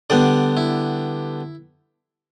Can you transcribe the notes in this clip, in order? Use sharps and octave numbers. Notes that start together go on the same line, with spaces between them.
D3 G3 B3 D4 D5
E4